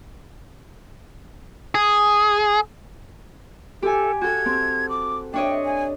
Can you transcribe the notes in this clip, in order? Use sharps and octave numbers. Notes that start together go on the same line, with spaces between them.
G#4
G4 A4 G#5
F#4 A4 G#6
C4
D6
D4 C#5 D#5 G5
G#5